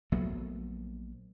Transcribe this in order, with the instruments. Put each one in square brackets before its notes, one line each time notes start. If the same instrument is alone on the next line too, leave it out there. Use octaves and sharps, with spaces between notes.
[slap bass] A#1 F#3 A3 B3